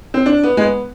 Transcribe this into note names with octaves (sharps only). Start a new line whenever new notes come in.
C4
D4
B3
G#3
B3